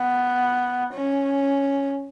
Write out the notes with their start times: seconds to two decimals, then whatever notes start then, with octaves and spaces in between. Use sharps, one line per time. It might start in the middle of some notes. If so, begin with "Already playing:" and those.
Already playing: B3
0.94 C#4